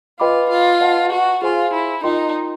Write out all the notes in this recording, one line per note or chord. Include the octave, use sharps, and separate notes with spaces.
F4 B4 D#5 G5 B5 D6
F4
B4 D#5 F#5 A5
F#4
F4 G#4 C5 F5 G#5 C6
E4
D#4 F4 A#4 D#5 G5 C6